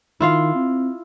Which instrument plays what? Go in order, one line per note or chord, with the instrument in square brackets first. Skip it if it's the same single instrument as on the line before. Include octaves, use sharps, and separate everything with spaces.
[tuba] D#3 [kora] E4 F4 F5
[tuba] C4